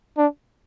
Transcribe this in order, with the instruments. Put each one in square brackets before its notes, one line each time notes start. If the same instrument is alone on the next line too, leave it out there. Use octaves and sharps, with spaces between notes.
[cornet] D4